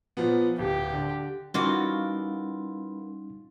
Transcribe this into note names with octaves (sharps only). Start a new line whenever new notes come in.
A#2 F3 B3
D1 G4
D3
E3 G3 A#3 C#4 D#4 F4 F#4